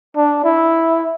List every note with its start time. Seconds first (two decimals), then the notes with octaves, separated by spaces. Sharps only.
0.16 D4
0.44 E4